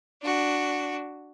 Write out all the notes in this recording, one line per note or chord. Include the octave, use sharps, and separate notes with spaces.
D4 F#4